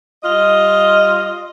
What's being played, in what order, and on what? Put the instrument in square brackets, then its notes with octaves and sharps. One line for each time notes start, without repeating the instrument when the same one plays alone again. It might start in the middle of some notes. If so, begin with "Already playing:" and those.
[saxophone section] G3 F4 D#5